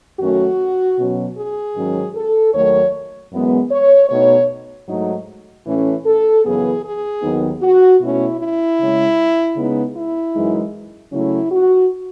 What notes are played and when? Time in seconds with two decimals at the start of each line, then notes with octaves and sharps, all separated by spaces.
0.20 F#2 D#3 A3 C#4 F#4
0.97 B2 F#3 C#4
1.37 G#4
1.76 G#2 D#3 F#3 C#4
2.15 A4
2.54 D#2 D#3 F#3 A3 C#5
3.32 F#2 E3 G#3 B3
3.71 C#5
4.10 B2 A3 D#4 C#5
4.88 G#2 F#3 A3 D#4
5.66 A2 E3 A3 C#4
6.05 A4
6.45 F#2 C#3 E3 B3 G#4
6.83 G#4
7.22 D#2 D#3 F#3 B3 D#4
7.62 F#4
8.00 B2 A3 C#4 E4
8.39 E4
8.78 C#3 G#3 C#4
9.56 C#3 G#3 B3 D#4
9.96 E4
10.35 F#2 E3 G#3 D#4
11.12 C#3 F#3 A3 C#4 E4
11.52 F#4